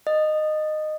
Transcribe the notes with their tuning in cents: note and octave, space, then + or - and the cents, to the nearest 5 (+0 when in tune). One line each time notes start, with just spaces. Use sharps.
D#5 -15